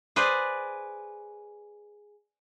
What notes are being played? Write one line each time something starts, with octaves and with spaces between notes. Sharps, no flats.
G#4 B4 C5 D5